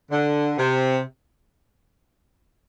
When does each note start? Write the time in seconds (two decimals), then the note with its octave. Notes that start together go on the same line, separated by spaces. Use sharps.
0.11 D3
0.58 C3